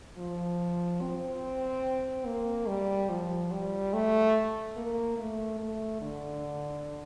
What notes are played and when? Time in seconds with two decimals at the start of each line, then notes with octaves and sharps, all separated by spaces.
0.17 F3
1.01 C4
2.26 A#3
2.68 G3
3.09 F3
3.51 G3
3.93 A3
4.77 A#3
5.18 A3
5.60 A3
6.02 D3